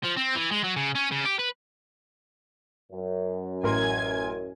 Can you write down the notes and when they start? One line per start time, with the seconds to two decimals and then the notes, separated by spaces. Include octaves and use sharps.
0.03 F3
0.16 C4
0.35 E3
0.51 G#3
0.64 F#3
0.76 C#3
0.95 C#4
1.11 C#3
1.25 G4
1.39 B4
2.92 F#2
3.63 A1 A#4 G#5 C6 G#6